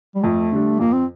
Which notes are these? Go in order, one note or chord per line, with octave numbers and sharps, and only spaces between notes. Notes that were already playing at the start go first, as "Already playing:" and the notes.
G3
F2 A3
D3 G3 D4
F2 A#3
C4